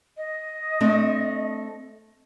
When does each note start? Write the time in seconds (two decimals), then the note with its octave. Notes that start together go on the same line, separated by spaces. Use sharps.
0.17 D#5
0.81 A3 C4 D4